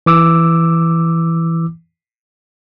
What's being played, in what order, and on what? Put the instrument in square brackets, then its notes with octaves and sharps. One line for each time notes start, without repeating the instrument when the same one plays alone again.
[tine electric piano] E3 D6 E6